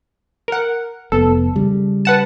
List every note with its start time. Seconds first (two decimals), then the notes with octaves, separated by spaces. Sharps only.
0.48 A#4 F#5
1.12 F1 B3 A4
1.56 C#3 G3
2.05 B4 F#5 A5